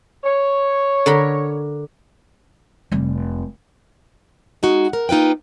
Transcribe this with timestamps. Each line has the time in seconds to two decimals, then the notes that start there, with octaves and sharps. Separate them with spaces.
0.24 C#5
1.06 D3 A#4 B5
2.92 F1 G3
4.63 G#3 D#4 F#4
4.93 A#4
5.09 A#3 D#4 F4 B4 G5